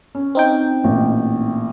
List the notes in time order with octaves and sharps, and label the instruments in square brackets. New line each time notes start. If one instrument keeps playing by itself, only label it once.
[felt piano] C#4
[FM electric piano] C4 D#4 G5
[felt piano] A1 A#2